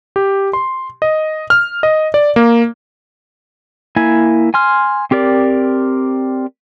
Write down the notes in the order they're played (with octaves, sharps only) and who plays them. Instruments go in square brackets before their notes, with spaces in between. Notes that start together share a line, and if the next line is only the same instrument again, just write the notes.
[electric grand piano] G4
C6
D#5
F6
D#5
D5
A#3
[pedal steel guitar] A#3 E4 G#5
G#5 C6 F6
C4 G4 A#4 D5